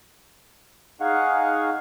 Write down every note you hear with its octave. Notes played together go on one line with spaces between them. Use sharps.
D#4 G#4 F5 F#5 C#6